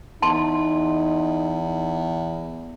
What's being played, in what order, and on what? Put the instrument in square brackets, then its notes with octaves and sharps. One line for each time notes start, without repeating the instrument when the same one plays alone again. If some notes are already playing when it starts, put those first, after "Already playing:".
[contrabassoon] E2 [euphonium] D#4 [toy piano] A5 C6